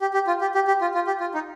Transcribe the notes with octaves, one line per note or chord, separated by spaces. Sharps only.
G4
G4
F4
G4
G4
G4
F4
F4
G4
F4
D#4